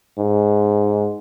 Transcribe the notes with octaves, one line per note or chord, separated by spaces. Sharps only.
G#2